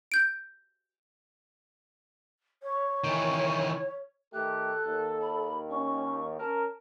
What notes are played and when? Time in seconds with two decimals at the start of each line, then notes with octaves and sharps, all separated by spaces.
0.12 G6 D7
2.63 C#5
3.04 D#3 E3
4.34 D#3 A3 G4 A4 F#6
4.86 D#2
5.22 B5
5.71 C#4 C#6
6.40 C#4 A#4 A5